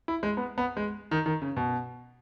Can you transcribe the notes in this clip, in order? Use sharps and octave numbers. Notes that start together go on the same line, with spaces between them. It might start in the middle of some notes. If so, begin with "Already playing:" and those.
E4
G#3
B3
B3
G#3
D#3
D#3
C#3
B2